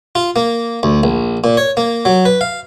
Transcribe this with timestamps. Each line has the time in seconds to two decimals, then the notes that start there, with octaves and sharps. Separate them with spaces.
0.15 F4
0.36 A#3
0.83 D2
1.03 A#1
1.44 A#2
1.57 C#5
1.77 A#3
2.05 F#3
2.25 B4
2.41 F5